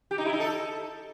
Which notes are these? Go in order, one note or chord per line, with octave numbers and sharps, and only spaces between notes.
G4
D#4
E4
D#4
A4